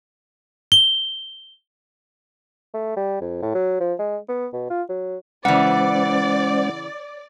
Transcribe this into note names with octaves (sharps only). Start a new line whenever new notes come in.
G7
A3
G3
F2
A2
F#3
F3
G#3
B3
B2
F4
F#3
C#3 E3 G#3 C#4 C5 D5 F#5